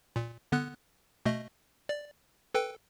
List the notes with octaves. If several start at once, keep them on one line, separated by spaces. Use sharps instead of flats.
A#2
D3 B3 F#6
B2 A3 D#5
D5
A4 B4 G5